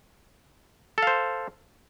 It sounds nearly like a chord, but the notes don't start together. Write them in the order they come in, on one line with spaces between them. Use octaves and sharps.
A4 F5 C5